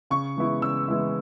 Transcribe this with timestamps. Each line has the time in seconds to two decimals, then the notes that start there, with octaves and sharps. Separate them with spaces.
0.10 C#3 C#6
0.36 E3 G#3 B3 E4
0.62 C#3 E6
0.88 E3 G#3 B3 E4